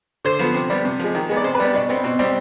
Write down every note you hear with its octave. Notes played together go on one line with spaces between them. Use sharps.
D3 C5
F3 B3
C3
G3 B3
C3
F3 G#3
D#3
G#3 B3
D5
C3 C5
B4
G3 B3 D4
B2 D4
B3 C4
B2 C4
G3 C4